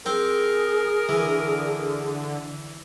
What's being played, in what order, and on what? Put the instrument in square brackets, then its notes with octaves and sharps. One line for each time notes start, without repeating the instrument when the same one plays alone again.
[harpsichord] C4 C5 [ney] G#4 [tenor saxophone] A#4
[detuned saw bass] D3 [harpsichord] E3